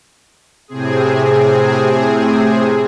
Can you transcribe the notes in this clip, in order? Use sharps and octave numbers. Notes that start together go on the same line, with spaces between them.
A2 C3 C4 G#4